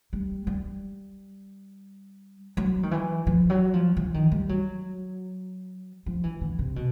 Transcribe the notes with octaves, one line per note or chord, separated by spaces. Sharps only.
G3
G3
F#3
D#3
E3
F3
F#3
F3
E3
D#3
G3
F#3
F3
E3
D3
C3
B2